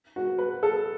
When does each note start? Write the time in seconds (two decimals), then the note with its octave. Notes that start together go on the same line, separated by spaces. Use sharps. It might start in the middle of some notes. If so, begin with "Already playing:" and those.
0.16 F#4
0.38 B4
0.63 A4